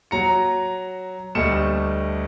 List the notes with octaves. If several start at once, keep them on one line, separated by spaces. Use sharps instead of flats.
F#3 A#5 C#7
D2 G3 A3 D#5 C#7 E7